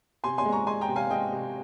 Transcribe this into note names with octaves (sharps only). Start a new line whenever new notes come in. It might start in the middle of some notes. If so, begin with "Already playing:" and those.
C3 G#5 C6
G#5 C6
G#3
A#5 C#6
G#3 G#5 C6
G5 A#5
C3
F5 G#5
G#3 D#5 G5
C3